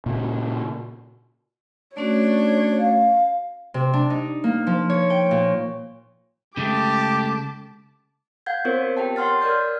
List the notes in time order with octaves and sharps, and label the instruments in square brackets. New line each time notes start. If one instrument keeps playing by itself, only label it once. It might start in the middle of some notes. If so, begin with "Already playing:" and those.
[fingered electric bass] A#2 C#3
[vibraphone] A3 C#4 F#4 [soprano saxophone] D4 [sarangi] C#5
[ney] F5
[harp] C3
D4
D#4
A#3
F3
C#5
G5
A#2
[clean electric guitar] C#3 G#3 A3 [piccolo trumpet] G4 [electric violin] A5 D6
[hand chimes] F5 F#5 G6 G#6
B3 C4 F4 A#4 C5 C#5
G4 A#4 G5 A5
C#5 F#5 C6 F6 A6
A#4 D5 D#5 F6 G6